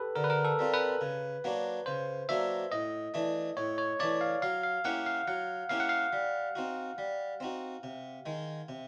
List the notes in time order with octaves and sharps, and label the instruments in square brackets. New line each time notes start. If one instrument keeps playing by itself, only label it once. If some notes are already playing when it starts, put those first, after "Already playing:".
Already playing: [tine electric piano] G4 A4 B4
[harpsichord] D3 [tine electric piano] A#4
[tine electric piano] B4
A#4
A4
[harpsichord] G3 C4 F4
[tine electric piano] B4
[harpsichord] C#3
F#3 A#3 D4 F#4
[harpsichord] C#3 [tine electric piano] C5
[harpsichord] F#3 A#3 D4 F#4 [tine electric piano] E5
[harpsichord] A2 [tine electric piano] D#5
[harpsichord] E3 A3 D4
[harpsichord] A2 [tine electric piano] C#5
[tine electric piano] C#5
[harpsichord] E3 A3 D4 [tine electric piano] D5
[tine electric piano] F5
[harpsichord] F#3 [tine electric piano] F5
[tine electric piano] F5
[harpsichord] A#3 C#4 E4 G4 [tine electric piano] F#5
[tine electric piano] F5
[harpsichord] F#3 [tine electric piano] F#5
[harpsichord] A#3 C#4 E4 G4 [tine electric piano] F5
[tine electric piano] F#5
F5
[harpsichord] G3
C4 D#4 F#4
G3
C4 D#4 F#4
C3
D#3 G#3
C3